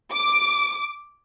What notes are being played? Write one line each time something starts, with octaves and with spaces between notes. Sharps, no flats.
D6